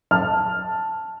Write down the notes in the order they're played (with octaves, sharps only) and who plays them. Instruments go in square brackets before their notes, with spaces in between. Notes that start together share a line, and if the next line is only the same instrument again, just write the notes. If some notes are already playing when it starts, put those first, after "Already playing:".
[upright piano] A5 F6